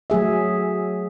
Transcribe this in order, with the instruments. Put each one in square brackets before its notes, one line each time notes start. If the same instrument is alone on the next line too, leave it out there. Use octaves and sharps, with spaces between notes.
[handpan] F#3 A3 G#4 E5